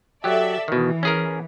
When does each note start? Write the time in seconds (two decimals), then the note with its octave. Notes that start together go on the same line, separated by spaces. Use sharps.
0.24 F#3 G4 A4 D5 E5
0.68 B2 D#3 E3
1.03 C#4 G#4 A#4